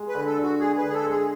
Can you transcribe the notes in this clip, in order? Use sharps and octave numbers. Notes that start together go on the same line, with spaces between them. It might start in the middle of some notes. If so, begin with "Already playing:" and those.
Already playing: G#3
B4
D3
A4
D4
F#4
G#3 G#4
D3 B4
G#4
A4
G#3 G#4